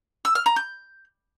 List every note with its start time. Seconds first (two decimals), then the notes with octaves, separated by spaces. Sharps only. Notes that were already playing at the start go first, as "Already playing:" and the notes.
0.25 E6
0.35 F6
0.46 A#5
0.56 G6